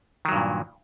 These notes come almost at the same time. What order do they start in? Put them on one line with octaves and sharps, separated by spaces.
D#3 F#3 G2 A#2